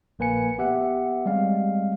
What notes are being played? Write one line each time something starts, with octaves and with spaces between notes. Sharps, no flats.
A#1 A#3 B4 G#5 C#7
B3 G4 E5 F#5
G3 G#3 C4 F5